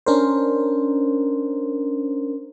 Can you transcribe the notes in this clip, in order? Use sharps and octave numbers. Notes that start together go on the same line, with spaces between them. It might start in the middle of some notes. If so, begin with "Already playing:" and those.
C#4 D4 A#4 C5